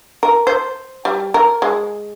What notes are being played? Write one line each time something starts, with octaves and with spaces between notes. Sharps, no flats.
A#4
C5
G3
A#4
G#3